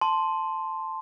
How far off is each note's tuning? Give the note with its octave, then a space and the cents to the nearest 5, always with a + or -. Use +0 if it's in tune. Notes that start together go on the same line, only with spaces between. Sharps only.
A5 +0 C6 +0